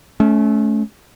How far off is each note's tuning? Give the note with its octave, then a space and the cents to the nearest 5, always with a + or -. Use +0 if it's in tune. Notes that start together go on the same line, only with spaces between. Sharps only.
A3 -25 C#4 +15